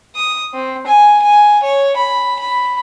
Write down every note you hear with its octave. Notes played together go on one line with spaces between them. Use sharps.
D#6
C4
G#5
G#5
C#5
B5
B5